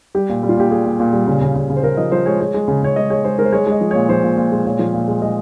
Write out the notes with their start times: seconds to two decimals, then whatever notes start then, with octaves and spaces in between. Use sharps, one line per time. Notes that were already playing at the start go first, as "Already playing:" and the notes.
0.15 G3 G4
0.29 A#2
0.43 G3
0.49 F4
0.57 A#2 G4
0.71 A#2 G#4
0.86 A#2
1.00 A#2
1.13 G3
1.27 C#3
1.41 C#3
1.56 C#3
1.70 C#3
1.77 C5
1.83 C#3 A#4
1.97 F3 D#5
2.12 F3 C5
2.26 G#3 C#5
2.40 G#3 C#5
2.54 G#3
2.68 C#3
2.83 C#3 C#5
2.96 G#3 D#5
3.10 G#3 C#5
3.24 G#3 C5
3.39 G#3 A#4
3.45 C5
3.52 G#3 C#5
3.67 G#3 D#5
3.81 F3
3.91 A#2 C#5
4.09 F3 C5
4.23 A#2
4.37 A#2
4.52 G#3
4.65 A#2 C#5
4.79 F3
4.94 A#2
5.08 G#3
5.22 G#3 D#5